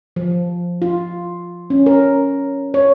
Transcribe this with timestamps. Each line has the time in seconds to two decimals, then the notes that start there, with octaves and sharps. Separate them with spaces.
0.16 F3
0.82 F4
1.70 C#4
1.86 A#4
2.74 C#5